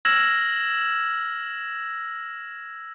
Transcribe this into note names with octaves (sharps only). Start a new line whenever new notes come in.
E6 F6 G#6 A#6 E7 F#7